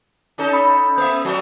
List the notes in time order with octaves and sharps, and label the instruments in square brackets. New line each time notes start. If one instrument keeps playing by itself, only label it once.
[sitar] C#4 D#4 A4
[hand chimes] B5
[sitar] A#3 E5
F3 A3